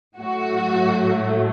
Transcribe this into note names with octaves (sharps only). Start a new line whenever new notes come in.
A2 F#3 A3 F#4